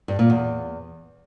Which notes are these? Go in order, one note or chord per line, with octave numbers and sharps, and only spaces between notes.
G2
A#2
E2